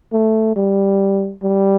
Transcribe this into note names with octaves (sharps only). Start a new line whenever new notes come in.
A3
G3
G3